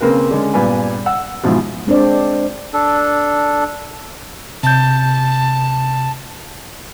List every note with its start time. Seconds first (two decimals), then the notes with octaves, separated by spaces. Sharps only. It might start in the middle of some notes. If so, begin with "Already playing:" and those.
0.01 C#3 A#3 C4 A#4 B4
0.31 D3 G#3 C#4
0.54 G2 A#2 B3 G#5 B5
1.06 F#5 E6
1.44 E2 G#2 B2 F3
1.87 G#3 C4 D4 C5 D5
2.73 D4 A4
4.63 C3 A5 G6